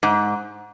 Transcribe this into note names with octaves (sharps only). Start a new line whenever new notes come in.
G#2